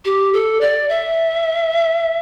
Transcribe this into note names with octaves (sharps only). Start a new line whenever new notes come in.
G4
A4
D5
E5